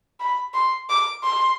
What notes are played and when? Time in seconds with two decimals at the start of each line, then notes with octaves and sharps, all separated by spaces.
0.20 B5
0.54 C6
0.89 D6
1.23 C6